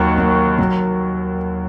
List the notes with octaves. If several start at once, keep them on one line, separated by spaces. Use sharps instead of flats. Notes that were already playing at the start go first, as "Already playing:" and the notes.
Already playing: D#2 F#3 C#6
F#3
F#3